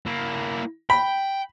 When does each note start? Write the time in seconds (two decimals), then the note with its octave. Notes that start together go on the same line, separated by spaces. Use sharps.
0.06 A#3 E4
0.90 G5 B5